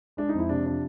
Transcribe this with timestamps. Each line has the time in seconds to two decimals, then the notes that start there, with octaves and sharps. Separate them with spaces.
0.17 G#3 D4
0.29 D#4
0.34 F2 E4
0.49 C3 D4
0.66 F3 D4